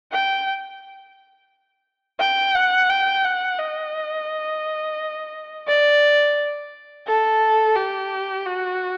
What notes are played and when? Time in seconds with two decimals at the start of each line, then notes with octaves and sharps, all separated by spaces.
0.12 G5
2.20 G5
2.55 F#5
2.90 G5
3.24 F#5
3.59 D#5
5.67 D5
7.07 A4
7.75 G4
8.46 F#4